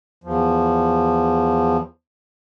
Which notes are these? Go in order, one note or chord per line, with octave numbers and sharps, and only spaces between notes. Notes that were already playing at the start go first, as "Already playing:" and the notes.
E2 F3